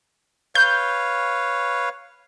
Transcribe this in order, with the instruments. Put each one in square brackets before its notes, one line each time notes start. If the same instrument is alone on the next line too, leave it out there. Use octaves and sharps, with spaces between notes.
[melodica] B4 C#5 F5 [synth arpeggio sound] G6